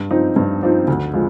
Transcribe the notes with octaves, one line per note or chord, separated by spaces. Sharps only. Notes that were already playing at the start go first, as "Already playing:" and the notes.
Already playing: G2
F3 C4 D#4
G2
F3 C4 D#4
D2
F3 G#3